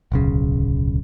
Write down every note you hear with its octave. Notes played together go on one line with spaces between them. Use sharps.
D1 B1 C#3